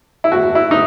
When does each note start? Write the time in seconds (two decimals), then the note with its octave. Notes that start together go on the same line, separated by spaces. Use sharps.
0.24 E4
0.32 F#4
0.55 E4
0.71 D#4